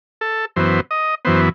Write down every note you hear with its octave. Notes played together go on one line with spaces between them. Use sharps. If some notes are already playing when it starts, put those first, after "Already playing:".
A4
F#2 E3 B3 C5
D#5
F#2 E3 B3 C5